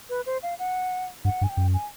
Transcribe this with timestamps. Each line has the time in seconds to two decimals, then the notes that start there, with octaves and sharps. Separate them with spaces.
0.10 B4
0.26 C5
0.43 F5
0.59 F#5
1.25 G2 F#5
1.41 G2 G#5
1.49 G5
1.57 F#2
1.74 G#5